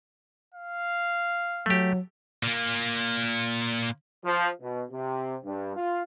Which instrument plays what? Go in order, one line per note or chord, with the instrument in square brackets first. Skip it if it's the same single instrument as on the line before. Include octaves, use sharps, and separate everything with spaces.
[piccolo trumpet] F5
[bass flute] F#3 [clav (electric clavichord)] A3 G4
[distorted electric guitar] A#2 A#3
[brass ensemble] F3
B2
C3
G2
F4